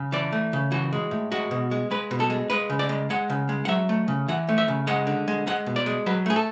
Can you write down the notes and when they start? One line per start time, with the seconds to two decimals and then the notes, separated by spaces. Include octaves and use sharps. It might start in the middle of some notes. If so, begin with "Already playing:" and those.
Already playing: C#3
0.12 E3 D5
0.32 A3
0.53 C#3
0.72 E3 F#4
0.93 G#3
1.11 A2
1.32 G#3 F#4
1.51 B2
1.71 G#3
1.91 G#3 B4
2.11 B2
2.20 A4
2.30 G#3
2.50 G#3 B4
2.70 C#3
2.79 D5
2.89 G#3
3.10 G#3 F#5
3.30 C#3
3.49 G#3
3.65 F#5
3.68 F#3 E5
3.89 A3
4.08 C#3
4.28 E3 F#5
4.49 A3
4.58 E5
4.68 C#3
4.87 G#3 F#5
5.07 D3
5.28 G#3
5.47 G#3 F#5
5.66 B2
5.76 D5
5.86 G#3
6.06 F#3 B4
6.26 A3 G#4
6.36 A4